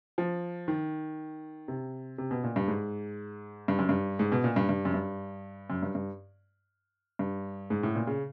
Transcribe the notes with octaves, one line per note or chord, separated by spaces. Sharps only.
F3
D#3
C3
C3
B2
A#2
G2
G#2
G2
F#2
G2
G#2
B2
A#2
G2
G2
F#2
G2
F#2
G2
G2
G2
G#2
A2
A#2
C#3